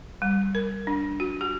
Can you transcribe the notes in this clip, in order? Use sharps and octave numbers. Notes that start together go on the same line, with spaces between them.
G3
A#4
D4
F#4
G4